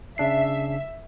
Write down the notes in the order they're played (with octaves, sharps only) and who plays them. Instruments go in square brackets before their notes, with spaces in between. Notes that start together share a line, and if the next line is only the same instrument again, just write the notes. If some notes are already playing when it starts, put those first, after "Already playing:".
[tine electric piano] C#3 D4 C7 [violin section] E5